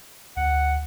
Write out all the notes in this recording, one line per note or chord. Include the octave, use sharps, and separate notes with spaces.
D2 F#5